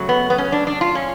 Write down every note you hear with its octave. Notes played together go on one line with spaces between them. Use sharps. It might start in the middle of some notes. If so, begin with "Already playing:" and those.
Already playing: C#3 F#3 A3
B3
B3
C#4
D4
D4
F4
C#4